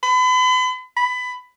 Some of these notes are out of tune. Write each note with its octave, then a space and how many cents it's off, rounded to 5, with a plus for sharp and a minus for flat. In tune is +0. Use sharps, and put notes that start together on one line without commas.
B5 +40
B5 +20